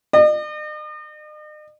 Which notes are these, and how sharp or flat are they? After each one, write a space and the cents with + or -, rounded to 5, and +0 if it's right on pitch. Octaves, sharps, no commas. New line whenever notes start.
D#5 -45